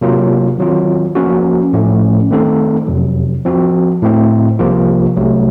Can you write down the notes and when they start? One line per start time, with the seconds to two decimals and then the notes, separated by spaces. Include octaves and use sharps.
0.01 C3 F#3 A#3 F4
0.59 D#3 F#3 C4 F4
1.15 F3 A#3 C#4 F#4
1.73 A2 F3 A3 C#4
2.30 D#3 A3 C4 D#4 A4
2.87 F2 C3 F#3
3.45 F3 C4 F#4
4.02 A2 A3 C4
4.59 C2 C3 F3 A#3 F4
5.17 C2 C3 F#3 A3